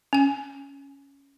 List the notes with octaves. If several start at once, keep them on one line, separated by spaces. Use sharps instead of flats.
C#4 G#5